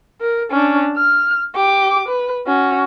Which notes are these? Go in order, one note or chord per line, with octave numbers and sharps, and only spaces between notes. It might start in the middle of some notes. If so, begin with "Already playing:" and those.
A#4
C#4 D4
F6
G4 D6
B4
C#4 F#4